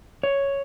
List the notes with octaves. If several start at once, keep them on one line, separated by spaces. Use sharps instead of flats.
C#5